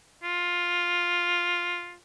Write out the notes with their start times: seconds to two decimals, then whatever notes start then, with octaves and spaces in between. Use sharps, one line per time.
0.23 F4